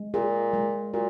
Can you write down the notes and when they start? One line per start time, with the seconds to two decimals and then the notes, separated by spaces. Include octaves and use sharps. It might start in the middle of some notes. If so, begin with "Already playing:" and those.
Already playing: G#3
0.14 A#2 G#4
0.54 G#3
0.94 A#2 F#4